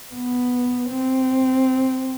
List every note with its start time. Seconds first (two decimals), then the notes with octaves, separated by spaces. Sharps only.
0.15 B3
0.90 C4